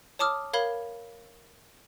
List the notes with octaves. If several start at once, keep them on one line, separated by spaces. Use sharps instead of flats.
C#5 A5 D6 D#6 F6
A#4 C#5 F5 B5 G#6 G7